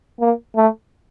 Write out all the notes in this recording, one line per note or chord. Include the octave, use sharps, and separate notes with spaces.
A#3
A3